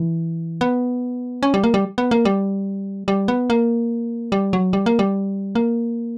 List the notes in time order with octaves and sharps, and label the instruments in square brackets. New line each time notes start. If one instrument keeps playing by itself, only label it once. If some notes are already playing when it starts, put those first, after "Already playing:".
Already playing: [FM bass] E3
B3
C#4
G3
A#3
G3
B3
A#3
G3
G3
B3
A#3
G3
F#3
G3
A#3
G3
A#3